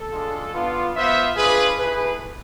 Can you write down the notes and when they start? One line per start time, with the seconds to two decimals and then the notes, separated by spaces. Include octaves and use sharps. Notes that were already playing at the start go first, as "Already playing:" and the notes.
Already playing: A4
0.11 G#3 D4 F4
0.53 B3 D4 F4
0.95 B3 F4 C5 E5
1.37 G#3 D4 F4 G#4 B4
1.79 A3 E4 G#4 B4